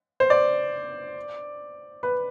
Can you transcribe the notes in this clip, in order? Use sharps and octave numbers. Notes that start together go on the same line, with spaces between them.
C5
D5
B4